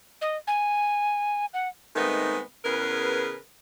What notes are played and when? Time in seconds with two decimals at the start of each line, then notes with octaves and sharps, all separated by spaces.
0.21 D#5
0.47 G#5
1.54 F#5
1.96 D#3 G#3 A3 B3 C4 D#4
2.65 E2 C#3 G#4 A#4 B4